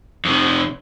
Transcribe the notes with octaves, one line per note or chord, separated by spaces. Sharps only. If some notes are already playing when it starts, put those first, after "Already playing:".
F2 C3